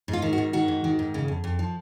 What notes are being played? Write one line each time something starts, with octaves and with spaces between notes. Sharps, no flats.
G#2
F4
D#3
F#4
G#2
D#3 F#4
G#2
D#3
G#2
C#3
F2
F2
F3